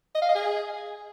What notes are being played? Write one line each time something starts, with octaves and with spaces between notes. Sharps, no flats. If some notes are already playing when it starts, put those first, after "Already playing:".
D#5
F5
D#5
G#4